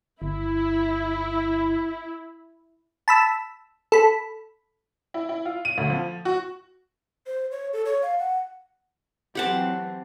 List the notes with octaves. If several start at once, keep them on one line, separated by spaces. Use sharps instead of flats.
G1 E4
A5 B5 E6
A4 B5
E4
E4
F4
D#7
D2
F3
F#4
C5
C#5
A4
C#5
F5
F#5
E3 F#3 C4 G4 F#5 A5